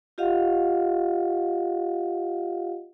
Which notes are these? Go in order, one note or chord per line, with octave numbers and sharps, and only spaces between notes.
F4 G4 D#5 F5 F#5